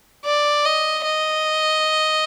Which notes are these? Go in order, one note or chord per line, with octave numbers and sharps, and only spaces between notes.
D5
D#5
D#5